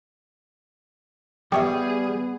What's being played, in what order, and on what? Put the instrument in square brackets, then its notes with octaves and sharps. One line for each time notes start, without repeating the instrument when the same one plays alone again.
[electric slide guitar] G3 [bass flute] B3 [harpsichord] G4 C#5 E5 [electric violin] G#4